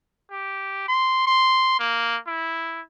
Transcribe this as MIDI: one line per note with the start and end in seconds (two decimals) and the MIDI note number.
0.31 0.87 67
0.88 1.22 84
1.27 1.75 84
1.79 2.18 58
2.27 2.81 64